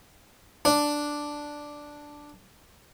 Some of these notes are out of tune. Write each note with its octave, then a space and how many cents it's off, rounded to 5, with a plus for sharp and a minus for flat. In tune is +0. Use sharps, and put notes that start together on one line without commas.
D4 +0